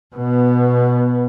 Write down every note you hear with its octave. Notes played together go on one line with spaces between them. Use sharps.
B2 B3